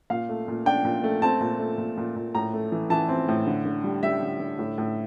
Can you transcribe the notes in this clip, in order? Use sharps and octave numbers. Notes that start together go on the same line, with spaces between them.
A#2 F5
A3
A#2
D4 G5
A#2
A3
C4 A5
A#2
A3
A#2
A#2
A#2
A2 A#5
A3
E3
E3 A5
C4
A2
D3
D3
G3
G3 E5
D3
D3
A2
A2